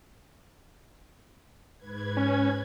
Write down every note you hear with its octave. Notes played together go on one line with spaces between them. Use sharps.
G#2 B4 G#6
C#4